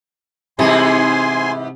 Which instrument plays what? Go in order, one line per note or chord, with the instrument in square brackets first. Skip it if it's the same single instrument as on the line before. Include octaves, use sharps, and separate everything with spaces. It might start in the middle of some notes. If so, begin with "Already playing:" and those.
[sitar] G#2 E3 B3 [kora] C3 G3 A4 [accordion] G#5 C6